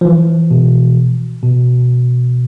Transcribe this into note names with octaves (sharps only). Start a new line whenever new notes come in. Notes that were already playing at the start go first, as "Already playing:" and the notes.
F3
E3
B2
B2